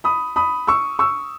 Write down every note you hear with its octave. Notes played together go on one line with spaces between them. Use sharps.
B5 D#6
B5 D#6
C#6 E6
C#6 E6